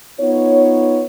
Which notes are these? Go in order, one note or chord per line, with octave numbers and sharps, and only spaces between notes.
B3 D#4 F4 C#5